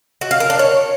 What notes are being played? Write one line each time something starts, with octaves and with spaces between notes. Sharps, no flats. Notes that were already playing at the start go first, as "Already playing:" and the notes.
F#4
F5
A#4
D4
C#5